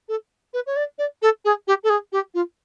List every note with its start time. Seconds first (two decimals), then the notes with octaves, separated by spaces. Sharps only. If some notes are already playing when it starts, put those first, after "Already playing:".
0.08 A4
0.53 B4
0.66 C#5
0.76 D5
0.98 D5
1.22 A4
1.44 G#4
1.67 G4
1.83 A4
1.89 G#4
2.12 G4
2.34 F4